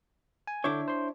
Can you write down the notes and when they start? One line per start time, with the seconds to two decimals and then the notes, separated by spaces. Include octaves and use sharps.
0.47 G#5
0.64 D3 D4 E4 C#5 D6 G6
0.88 C5 C6